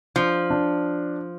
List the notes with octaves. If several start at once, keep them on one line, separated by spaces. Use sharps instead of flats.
F3 D4
D4